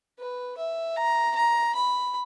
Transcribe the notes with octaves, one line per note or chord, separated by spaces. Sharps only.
B4
E5
A#5
A#5
B5